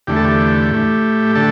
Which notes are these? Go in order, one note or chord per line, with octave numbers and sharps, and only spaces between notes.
E2 D3 A3 G4
A4
G4
A2 A3
D3 A3 A4